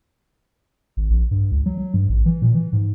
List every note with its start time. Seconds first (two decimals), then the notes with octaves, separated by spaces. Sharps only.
0.97 G#1
1.10 A#1
1.31 G2
1.51 C#2
1.66 F#3
1.77 F#3
1.94 G2
2.09 A1
2.26 E3
2.42 A#2
2.54 E3
2.73 G#2